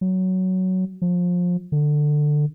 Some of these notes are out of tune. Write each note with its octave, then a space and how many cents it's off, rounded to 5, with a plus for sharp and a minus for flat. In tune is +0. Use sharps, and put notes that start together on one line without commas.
F#3 +10
F3 +25
D3 +15